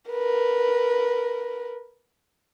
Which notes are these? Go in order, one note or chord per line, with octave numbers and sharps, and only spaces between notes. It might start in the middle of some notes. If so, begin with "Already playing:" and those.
A#4 B4